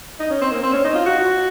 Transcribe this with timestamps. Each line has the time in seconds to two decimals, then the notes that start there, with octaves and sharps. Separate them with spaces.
0.20 D#4
0.30 C#4
0.41 C4
0.51 A#3
0.63 C4
0.73 C#4
0.85 D#4
0.95 F4
1.06 F#4